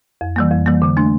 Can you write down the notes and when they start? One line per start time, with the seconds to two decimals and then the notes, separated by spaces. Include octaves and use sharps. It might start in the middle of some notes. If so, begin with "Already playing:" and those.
0.21 F2
0.36 E3 G3 A#3
0.51 F2
0.66 E3 G3 A#3
0.82 D3
0.97 A3 D4